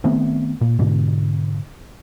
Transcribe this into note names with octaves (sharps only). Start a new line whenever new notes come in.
D#3 A3 B3 C4
A#2
G#2 B2 D3